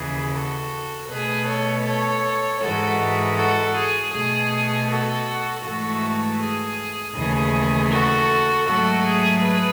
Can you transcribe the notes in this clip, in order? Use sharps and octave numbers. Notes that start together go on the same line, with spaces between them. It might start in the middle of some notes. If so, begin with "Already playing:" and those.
Already playing: D#2 C#3 E3 G#4
F#4 A4
B2 A3 G#4 B4
A4 C#5
A4 C#5
G#2 E3 G#3 F#4 A4
F#4 A4
G#4
B2 A3 G#4
F#4 A4
G#2 E3 A3 F#4 A4
G#4
D#2 C#3 E3 A3 G#4
F#4 A4
G#2 F#3 A3 F#4 A4
G#4
G#4 B4